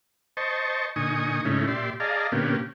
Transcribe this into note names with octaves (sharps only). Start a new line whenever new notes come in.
C5 D#5 A5 C#6
A#2 D3 D#4 G#5 C#6 D#6
G#2 C#3 A3 C#4 D#4 E4
A#2 G4 D5 E5 C6
G#4 D5 D#5 F5 A5 A#5
A#2 D3 A#3 B3 C#4 G4